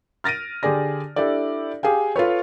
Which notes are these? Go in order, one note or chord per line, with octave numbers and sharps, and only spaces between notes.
F6 A6 A#6 D7 D#7
D3 G4 G#4 D5 A#6
D4 E4 G4 A4 D5
G4 G#4 F5 G5
F4 A4 B4 C#5